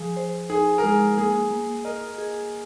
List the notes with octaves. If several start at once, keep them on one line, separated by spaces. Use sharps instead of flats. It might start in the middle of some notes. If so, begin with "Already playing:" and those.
Already playing: F3 G#4
C5
D#4 G#4
A#4
G#3 G#4
A#3 G#4
A#3
A#4 D#5
G#4